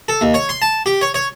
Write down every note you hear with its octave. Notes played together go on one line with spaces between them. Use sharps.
A4
D#2
C#5
C6
A5
G4
C#5
C#5